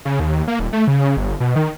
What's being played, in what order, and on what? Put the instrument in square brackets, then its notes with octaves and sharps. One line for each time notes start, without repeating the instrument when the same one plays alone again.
[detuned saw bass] C#3
D#2
A#3
D#1
A3
C#3
G1
B2
D#3